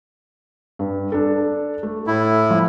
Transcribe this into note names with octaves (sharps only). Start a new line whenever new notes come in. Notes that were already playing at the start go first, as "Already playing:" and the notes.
G2
D4 A4
A3
A2 E4
F3